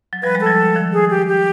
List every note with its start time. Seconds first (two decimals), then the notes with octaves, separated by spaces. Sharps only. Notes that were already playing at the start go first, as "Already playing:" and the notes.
0.13 F#3
0.23 F3 G3 B4
0.35 F#3 G#3
0.41 A4
0.46 F3 G3
0.76 D#3 F3
0.93 G#4
1.10 G4
1.28 G4